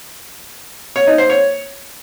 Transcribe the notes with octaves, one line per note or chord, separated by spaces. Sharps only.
C#5
D#4
C5
C#5